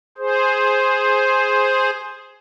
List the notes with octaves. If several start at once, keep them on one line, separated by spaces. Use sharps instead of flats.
G#4 C5